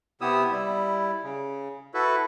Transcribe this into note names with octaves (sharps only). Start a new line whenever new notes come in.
C3 B3 E4 G4 D#6 E6
G3 E4
C#3
E4 F#4 A4 B4